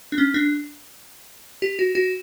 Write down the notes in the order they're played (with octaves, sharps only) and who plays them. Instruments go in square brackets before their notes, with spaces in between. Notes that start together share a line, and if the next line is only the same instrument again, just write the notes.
[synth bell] D4
C#4
D4
G4
F#4
F#4